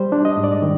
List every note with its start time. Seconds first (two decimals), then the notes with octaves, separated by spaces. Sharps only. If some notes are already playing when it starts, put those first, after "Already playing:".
Already playing: G3 C5
0.12 D4
0.25 D#5
0.38 G#2
0.44 D5
0.62 D#3